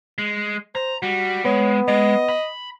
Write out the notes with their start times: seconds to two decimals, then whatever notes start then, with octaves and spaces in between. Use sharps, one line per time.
0.18 G#3
0.75 C5 A#5
1.02 G3 F#4
1.45 G#3 B3 C#5
1.88 G#3 D#5
2.29 B5